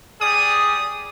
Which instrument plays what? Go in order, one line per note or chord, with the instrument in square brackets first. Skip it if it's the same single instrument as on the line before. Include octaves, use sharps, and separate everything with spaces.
[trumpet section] G3 G#4 D5 [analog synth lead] D#6